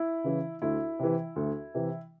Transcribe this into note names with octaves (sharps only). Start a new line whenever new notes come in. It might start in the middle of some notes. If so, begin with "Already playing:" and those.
Already playing: E4
C#3 E3
D2 E4
C3 E3
D2
C3 E3